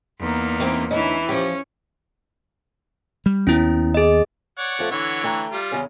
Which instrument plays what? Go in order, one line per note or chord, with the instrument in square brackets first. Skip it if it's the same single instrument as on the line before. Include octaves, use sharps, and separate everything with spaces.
[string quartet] E2 A#3 D#4
[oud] E3 C4
[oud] D2 C#4 D#4 [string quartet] E3 E4
[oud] F3 G4 [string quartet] C#4
[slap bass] G3
[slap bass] D#2 B3 [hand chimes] C#4 E4
[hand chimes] G#4 D#5
[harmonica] C#5 D5 F#5
[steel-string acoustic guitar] F2 F3 A3
[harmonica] D3 E3 C#5 [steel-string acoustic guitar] F#5
[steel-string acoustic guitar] A3 G5 A#5
[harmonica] G3 F4
[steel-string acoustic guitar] E2 C#3 C#4